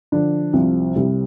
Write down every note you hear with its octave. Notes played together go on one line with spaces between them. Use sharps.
D3 F3 D4
C2 C3 F3
C2 C3 G3